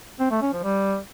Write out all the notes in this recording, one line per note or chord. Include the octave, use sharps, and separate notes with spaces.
C4
A3
C#4
F3
G3